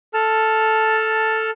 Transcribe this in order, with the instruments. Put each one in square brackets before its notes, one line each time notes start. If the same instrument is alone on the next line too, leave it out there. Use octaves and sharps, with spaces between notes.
[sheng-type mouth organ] A4 A5 F6